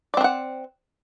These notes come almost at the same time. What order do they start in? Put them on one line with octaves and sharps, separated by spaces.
D5 C4 D4 F#5